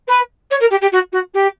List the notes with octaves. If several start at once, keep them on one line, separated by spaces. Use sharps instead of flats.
B4
C#5
A#4
G4
G4
F#4
F#4
G4